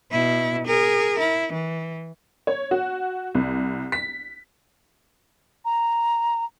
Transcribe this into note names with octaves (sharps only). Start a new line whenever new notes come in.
B2 E4
G#4 A#4
E4
E3
C#5
F#4
C2
B6
A#5